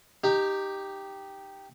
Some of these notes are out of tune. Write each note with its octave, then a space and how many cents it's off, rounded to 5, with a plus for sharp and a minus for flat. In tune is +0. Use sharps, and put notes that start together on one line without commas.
D#4 -15 G4 +0